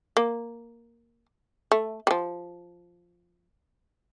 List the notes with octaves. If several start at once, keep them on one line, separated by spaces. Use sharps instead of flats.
A#3
A3
G3
F3